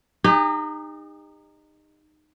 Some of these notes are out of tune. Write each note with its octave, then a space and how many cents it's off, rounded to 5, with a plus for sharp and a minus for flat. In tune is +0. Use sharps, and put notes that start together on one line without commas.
D#4 -20 G4 +45